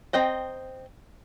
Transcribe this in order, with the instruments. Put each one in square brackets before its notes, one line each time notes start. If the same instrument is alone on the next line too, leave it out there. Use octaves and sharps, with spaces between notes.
[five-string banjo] C4 D#5 G5 A#5